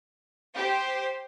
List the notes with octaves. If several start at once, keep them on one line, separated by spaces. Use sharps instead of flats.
G4 C5